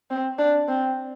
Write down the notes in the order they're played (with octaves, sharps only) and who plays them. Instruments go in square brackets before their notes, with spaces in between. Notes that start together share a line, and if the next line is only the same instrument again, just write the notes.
[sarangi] C4
D4
C4